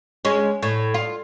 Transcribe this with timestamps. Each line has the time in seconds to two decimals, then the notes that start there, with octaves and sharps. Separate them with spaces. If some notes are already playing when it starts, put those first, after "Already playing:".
0.25 G#3 C#4
0.63 A2
0.94 F4